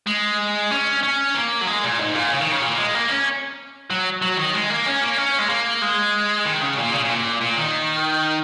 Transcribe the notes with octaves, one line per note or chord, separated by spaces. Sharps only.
G#3
C#4
C#4
A#3
F#3
G#3
A#2
G#2
A#2
C#3
D#3
C#3
A#2
G#3
A#3
C#4
F#3
F#3
D#3
G#3
A#3
C#4
A#3
C#4
G#3
A#3
G#3
D#3
C#3
A#2
C#3
C#3
A#2
A#2
D#3